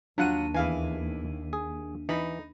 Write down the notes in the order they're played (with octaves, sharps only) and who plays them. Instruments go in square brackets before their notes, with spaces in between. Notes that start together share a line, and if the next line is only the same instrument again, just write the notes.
[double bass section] D#2 [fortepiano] F#3 F4 F#5 [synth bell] D4 D#7
[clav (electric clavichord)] E2 E3 [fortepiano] E4 F5 G#5
[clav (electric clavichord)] G#4
[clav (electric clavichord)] E3 [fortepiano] D#4 B5